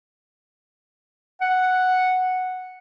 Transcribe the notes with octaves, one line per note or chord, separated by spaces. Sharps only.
F#5